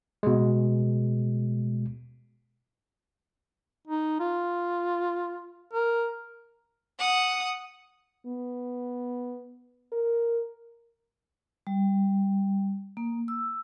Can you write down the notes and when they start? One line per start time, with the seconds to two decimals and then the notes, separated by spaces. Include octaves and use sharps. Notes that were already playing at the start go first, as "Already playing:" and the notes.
0.23 B2 G#3
3.87 D#4
4.20 F4
5.73 A#4
6.99 F#5 D#6
8.26 B3
9.92 A#4
11.67 G3
12.97 A#3
13.28 E6